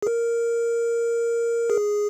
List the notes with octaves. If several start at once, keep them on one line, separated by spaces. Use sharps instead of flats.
G#4
A#4
G#4